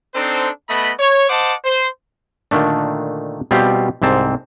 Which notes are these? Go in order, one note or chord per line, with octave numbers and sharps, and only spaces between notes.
C4 D4 D#4 A4 C5
A3 B3 D#5 B5
C#5
C5 D#5 F#5 A5 D6
C5
A#2 D3 D#3 A3 D4
B2 G3 C4 F4 G4
C2 G#2 C4 A5